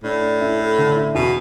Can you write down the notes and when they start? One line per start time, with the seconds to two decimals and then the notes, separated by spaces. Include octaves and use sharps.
0.03 A2 D4
0.21 D4
0.41 E4
0.59 A4
0.78 D3
0.96 E4
1.14 E2 B2